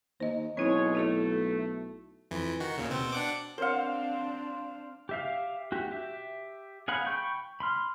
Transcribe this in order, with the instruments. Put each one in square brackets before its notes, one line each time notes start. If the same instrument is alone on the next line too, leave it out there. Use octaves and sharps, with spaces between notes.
[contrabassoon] D#2 [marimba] C5 D#5
[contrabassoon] B1 [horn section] B2 G#3 C#5 [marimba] C4 E4
[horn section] A3 [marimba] E4 F#4 C#5
[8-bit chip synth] F2 E3
D#3 F#4
D#2 A#2 C#3
B2 C4
D4 F#5 D6
[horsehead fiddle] C4 D4 [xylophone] A#4 C#5 F#5 [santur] C5 F5
[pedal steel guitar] G4 E5 F5
F#4 G4
G4 E5
G#4 F5 F#5 B5
G5 B5 C#6 G6
B5 C6 F6